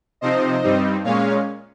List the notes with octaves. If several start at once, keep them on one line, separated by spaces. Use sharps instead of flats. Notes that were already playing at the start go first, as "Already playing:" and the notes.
C3 F3 C4 D#4 C5 D#5
G2 G3 C4 D#4
A#2 G#3 C#4 C#5 F5